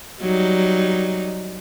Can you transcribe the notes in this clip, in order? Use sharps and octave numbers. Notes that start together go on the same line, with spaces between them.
F#3 G3 D#4